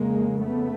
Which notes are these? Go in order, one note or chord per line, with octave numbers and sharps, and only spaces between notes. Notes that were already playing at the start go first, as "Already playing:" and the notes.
Already playing: F2 C#3 G#3 A#3
A3 B3